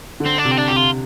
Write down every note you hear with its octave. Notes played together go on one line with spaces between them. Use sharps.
D3
C4
D4
C3
C4
D4
C3 G4
F4